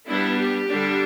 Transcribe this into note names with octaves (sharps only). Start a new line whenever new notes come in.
G3 B3 D4 E4
G4
D3 G3 D4